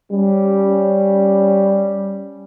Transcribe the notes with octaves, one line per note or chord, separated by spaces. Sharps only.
G3 C#4